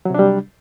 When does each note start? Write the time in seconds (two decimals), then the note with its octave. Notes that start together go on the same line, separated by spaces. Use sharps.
0.05 F#3
0.10 C3
0.14 D4
0.19 G3